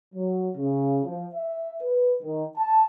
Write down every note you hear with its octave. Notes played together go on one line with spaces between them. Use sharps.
F#3
C#3
F3
E5
B4
D#3
A5